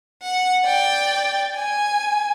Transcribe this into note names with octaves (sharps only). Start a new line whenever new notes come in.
F#5
D5 G5
G#5